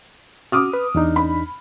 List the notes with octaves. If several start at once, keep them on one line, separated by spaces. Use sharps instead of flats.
F#4 D6 D#6 F6
B4
E2 D4 D#4
B5